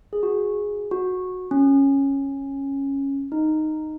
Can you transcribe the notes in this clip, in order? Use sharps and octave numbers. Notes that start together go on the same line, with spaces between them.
G#4
F#4
G#4
F#4
C#4
D#4